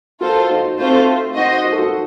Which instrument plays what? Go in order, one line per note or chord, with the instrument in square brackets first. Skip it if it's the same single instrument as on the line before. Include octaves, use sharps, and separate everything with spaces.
[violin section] F4 A4 C5 [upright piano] F#4 A#4
[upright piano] D#4 F#4
[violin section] A3 C4 F4 C5
[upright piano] D#4 [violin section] F#4 C5 D#5
[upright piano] F#4
A4
D#4 F#4